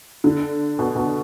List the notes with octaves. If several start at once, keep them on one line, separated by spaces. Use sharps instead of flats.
D3
B2
B2